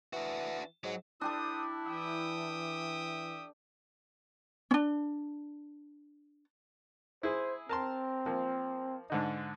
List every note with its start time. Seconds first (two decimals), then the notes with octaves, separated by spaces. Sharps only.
0.13 E3 D4 F#4
0.84 G#2 F#3
1.21 D4 E4 G4 A4 C5 D#6
1.87 E3 E5 G5 D#6
4.71 C#4 D4
7.23 E4 G#4 C5
7.69 C4 A#4 A5 C6
8.26 F3 A#3
9.10 G#2 D3 D#4